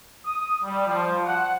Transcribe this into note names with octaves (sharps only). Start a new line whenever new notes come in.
D#6
G3
F3
F#5